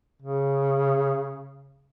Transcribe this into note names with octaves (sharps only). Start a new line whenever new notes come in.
C#3